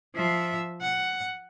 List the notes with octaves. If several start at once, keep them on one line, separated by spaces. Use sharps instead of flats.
F3 E5
F#5